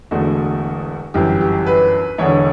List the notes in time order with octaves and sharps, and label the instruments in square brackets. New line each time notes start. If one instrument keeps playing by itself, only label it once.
[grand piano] E1 E2 D3 A3 F#4
G1 F#2 E3 G4
G4
B4
E1 E2 D3 C#5